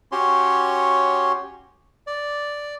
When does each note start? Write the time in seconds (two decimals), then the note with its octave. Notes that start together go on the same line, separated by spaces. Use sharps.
0.12 C#4 F#4 G4 C#5 C6
2.07 D5